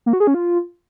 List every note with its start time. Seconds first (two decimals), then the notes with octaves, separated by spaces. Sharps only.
0.06 A#3
0.13 F#4
0.20 G#4
0.27 C#4
0.34 F4